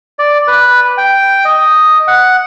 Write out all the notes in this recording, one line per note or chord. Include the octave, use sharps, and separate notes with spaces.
D5
B4
G5
D#5
F#5